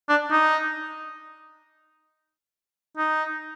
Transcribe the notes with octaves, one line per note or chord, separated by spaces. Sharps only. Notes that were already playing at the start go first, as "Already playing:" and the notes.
D4
D#4
D#4